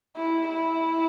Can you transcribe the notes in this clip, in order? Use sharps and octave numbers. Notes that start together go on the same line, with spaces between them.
E4
E4